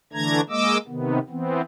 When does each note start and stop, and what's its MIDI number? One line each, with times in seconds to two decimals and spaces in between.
0.13 0.41 50
0.13 0.41 52
0.13 0.41 57
0.13 0.41 62
0.13 0.41 82
0.13 0.41 92
0.50 0.78 56
0.50 0.78 58
0.50 0.78 75
0.50 0.78 86
0.50 0.78 88
0.87 1.19 48
0.87 1.19 51
0.87 1.19 59
1.29 1.61 52
1.29 1.61 59
1.29 1.61 60